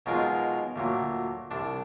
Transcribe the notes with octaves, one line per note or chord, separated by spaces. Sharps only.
B2 F#3 G#3 D#4 F4 A#4
D2 A#2 F#3
C2 D4